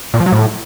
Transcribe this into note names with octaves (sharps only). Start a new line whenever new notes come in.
A#2
F3
F#3
A2